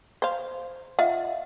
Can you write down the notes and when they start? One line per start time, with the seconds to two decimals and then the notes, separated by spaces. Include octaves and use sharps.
0.22 C5 F5
0.99 F4 D#5 E5 F#5